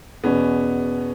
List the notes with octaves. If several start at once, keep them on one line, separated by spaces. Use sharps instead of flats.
E2 B2 B3 C#4